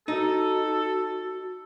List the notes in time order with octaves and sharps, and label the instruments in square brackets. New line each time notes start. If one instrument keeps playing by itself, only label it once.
[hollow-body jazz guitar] D#4 [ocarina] F#4 [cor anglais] A4